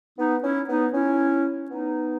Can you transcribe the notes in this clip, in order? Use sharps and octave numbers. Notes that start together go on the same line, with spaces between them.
B3 D#4
C#4 E4
B3 D#4
C#4 E4
B3 D#4